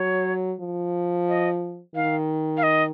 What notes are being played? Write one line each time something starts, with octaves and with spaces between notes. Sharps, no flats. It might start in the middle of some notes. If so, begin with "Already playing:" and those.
Already playing: F#3 C#5
F3
D#5
D#3 F5
F5
D#5